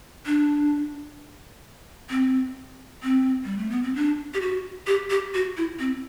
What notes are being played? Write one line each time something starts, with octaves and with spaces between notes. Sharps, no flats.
D4
C4
C4
G3
A3
B3
C4
D4
G4
F#4
G4
G4
F#4
E4
C4